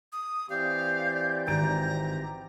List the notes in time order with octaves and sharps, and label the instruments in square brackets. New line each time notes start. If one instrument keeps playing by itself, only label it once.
[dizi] D#6
[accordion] E3 C4 G4 [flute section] D5 G6 [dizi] F5
[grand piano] G#1 A6 D7 [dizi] A#5